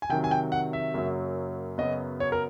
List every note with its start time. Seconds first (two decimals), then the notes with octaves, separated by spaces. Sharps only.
0.02 G#5
0.09 C3 D#3 F#3 G5
0.24 G#5
0.31 G5
0.52 F#5
0.73 E5
0.94 F#2 C#3 F#3 A#3
1.78 F#2 C#3 F#3 B3 D#5
2.20 C#5
2.32 A#4